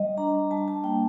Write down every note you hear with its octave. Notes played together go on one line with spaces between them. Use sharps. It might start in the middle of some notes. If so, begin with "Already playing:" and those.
Already playing: G3 D#5
D4 A#5
G3 A5
A5
A#3 G5